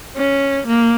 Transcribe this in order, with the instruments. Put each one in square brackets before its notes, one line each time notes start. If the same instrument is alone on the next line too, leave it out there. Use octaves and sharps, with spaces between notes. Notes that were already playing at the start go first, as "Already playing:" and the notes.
[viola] C#4
A#3